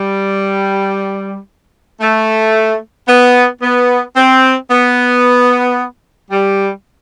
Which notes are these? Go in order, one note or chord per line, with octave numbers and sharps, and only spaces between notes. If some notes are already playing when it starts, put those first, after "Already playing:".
Already playing: G3
A3
B3
B3
C4
B3
G3